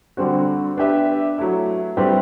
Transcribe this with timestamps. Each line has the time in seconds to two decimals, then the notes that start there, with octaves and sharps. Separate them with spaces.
0.17 D3 G3 C4 F#4
0.77 B3 D4 G4 B4 E5
1.38 F#3 A3 E4
1.97 A2 G3 C4 G4 B4